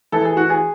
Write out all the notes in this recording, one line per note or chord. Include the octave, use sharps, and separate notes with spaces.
E3 A4
G#4
F#4
G#4